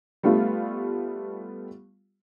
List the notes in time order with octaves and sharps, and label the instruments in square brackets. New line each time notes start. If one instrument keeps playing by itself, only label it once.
[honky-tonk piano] G3 A3 B3 F4